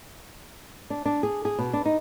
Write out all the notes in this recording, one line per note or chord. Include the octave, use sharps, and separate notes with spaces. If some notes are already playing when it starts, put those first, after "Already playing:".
D4
D4
G#4
G#4
B2
D4
D#4